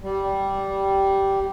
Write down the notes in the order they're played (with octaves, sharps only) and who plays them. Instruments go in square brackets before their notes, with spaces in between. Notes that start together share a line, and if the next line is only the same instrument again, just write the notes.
[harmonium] G3